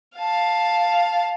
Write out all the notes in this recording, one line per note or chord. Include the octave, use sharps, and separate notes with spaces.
F5 A5